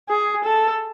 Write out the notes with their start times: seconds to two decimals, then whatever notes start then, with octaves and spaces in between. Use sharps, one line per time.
0.09 G#4
0.45 A4